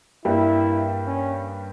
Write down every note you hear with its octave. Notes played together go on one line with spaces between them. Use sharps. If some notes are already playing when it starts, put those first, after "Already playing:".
G2 G3 A#3 E4
C#4